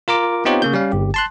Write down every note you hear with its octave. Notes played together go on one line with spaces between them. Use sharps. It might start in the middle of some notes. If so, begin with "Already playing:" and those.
F4 A#4 A#5 D6
B3 C4 D#4 F4 G4 C#5
C#3 A#3 G6
G3 C#4 F5
G1 G4
A5 C6 F#6